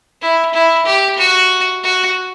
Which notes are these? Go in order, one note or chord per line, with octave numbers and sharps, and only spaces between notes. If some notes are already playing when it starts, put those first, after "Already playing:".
E4
E4
G4
F#4
F#4